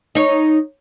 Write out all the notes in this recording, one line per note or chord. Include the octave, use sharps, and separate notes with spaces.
D#4 C#5